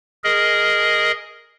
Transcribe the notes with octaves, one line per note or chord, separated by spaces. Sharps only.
G#4 A#4 D#5